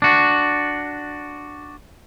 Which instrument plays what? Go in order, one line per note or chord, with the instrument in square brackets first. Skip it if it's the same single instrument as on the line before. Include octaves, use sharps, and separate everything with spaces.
[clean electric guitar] D4 F#4